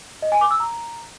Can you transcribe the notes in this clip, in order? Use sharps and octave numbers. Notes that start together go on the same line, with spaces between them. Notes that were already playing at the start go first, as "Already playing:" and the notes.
D#5
G#5
D6
E6
A#5